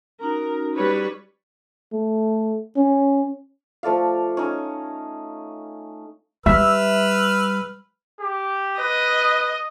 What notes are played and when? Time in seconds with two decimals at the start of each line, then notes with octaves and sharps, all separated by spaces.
0.21 C#4 D#4 F#4 A#4
0.75 G3 B4 C#5
1.92 A3
2.77 C#4
3.83 F3 A3 D5 F5
4.37 C#4 D#4 C#5
6.46 G3 B4 E5 E6 F6
8.20 G4
8.79 B4 D#5